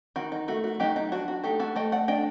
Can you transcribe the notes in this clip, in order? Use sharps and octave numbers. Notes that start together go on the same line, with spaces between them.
D#3 F#4
D#4
A3 F#4
F#4
F#3 D#4 G4
D#4
D4 F#4
F#4
A3 D#4 G4
F#4 A4
A3 D#5 G5
D5 F#5
D4 D#5 G5